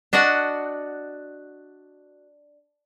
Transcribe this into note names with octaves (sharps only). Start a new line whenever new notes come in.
D4 F#4 D#5 F#5